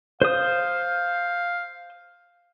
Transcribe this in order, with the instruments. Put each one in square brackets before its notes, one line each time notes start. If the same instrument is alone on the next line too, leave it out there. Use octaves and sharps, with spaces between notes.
[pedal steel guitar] C5 D#6 [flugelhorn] F5